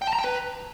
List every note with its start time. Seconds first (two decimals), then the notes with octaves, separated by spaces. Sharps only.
0.02 G5
0.07 A5
0.13 A#5
0.19 G5
0.24 B4